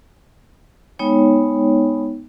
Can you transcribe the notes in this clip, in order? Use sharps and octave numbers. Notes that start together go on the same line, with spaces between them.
G#3 B3 D#4 C#5 G5